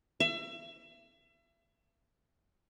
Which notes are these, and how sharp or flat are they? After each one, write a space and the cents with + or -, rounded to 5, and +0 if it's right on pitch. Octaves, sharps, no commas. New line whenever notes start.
E5 +35